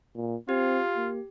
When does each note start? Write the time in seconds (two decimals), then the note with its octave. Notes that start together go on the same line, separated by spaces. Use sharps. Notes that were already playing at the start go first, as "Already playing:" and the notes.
0.15 A#2
0.49 C4 F4 G4
0.96 A#3